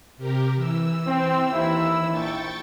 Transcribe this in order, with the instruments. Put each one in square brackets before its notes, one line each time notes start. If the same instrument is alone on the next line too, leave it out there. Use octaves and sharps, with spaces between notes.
[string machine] C3 G4 A#4
E3 E6
[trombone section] C4
D#2 E4
[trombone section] A#1 [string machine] G5 C#6 A6